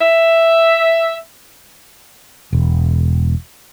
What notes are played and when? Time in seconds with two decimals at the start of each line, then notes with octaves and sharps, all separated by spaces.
0.01 E5
2.53 E1